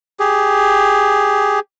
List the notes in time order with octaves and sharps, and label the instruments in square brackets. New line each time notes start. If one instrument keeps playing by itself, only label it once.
[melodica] G4 G#4